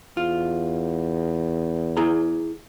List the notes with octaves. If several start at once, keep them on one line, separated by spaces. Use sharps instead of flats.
E2 F4
E4 G#4 A#5